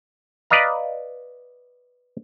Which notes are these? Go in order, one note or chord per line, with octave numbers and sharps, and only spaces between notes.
B4 D5 D#5 F5 A#5